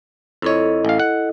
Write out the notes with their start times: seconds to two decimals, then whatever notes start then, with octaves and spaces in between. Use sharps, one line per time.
0.42 F2 E4 A4 C#5 D#5
0.85 A1 F5
0.99 F#5